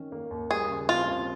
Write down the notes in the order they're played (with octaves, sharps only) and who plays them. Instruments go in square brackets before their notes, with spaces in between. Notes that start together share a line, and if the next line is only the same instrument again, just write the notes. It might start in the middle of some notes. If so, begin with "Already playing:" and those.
Already playing: [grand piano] D#3 C#4
A#3
D#2
[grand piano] G3 [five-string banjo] G#4
[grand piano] C#3
[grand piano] C4 [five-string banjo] F4
[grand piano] C#3